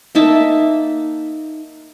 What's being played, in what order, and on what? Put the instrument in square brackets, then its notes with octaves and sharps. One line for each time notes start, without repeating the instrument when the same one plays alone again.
[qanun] A#3 D#4 E5 A5